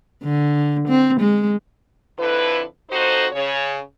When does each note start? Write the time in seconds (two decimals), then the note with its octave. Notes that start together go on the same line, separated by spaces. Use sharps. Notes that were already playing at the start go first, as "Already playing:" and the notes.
0.24 D3
0.88 C4
1.20 G#3
2.19 F2 D3 E4 B4
2.91 F2 D#4 F#4 A4 C5
3.32 C#3 C#5